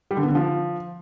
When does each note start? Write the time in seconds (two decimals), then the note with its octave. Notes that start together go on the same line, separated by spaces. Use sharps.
0.11 G3
0.17 D3
0.23 B3
0.29 D3
0.35 F3